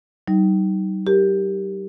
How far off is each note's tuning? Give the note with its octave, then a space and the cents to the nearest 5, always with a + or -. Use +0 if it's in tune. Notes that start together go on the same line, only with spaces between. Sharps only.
G3 -45 D#4 +10
G4 +0 A#4 +0